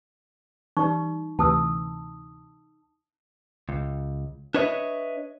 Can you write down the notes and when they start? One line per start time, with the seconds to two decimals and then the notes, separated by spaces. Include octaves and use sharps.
0.77 E3 G3 D#4 C#6
1.39 D2 C3 E3 A5 D#6 E6
3.69 C#2
4.54 D4 B4 C#5 D#5 E5